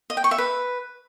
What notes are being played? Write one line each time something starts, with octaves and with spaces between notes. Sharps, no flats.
D#5
G5
C#6
E5
B4